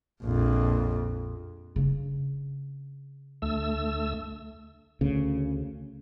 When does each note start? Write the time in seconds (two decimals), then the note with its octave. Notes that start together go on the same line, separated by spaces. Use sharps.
0.24 A#1 F2
1.76 C#3 D4
3.42 D2 A3 E6
5.01 D2 C#3